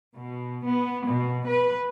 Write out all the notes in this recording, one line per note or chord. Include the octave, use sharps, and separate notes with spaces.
B2
B3
B2
B4